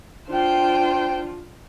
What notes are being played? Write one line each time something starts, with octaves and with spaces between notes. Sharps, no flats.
D4 F4 C5 G5